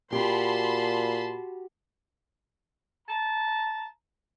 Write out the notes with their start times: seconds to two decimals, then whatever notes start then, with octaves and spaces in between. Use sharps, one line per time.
0.13 A#2 F#4 G4 A5 B5 C6
3.08 A5 A#5